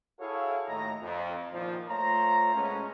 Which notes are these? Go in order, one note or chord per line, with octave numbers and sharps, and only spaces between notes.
E4 F#4 G#4 A4 C#5 F5
D#2 A2 D#3 D#5 A#5
F2
E2 A#2 D#3 F3
A3 F4 C5 C#5 A#5
B2 G#3 A3 B3 C#4